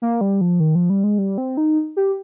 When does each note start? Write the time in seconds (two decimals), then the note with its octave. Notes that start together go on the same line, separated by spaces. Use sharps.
0.02 A#3
0.21 G3
0.41 F3
0.60 D#3
0.75 F3
0.90 G3
1.04 G#3
1.18 G3
1.38 C4
1.57 D#4
1.97 G4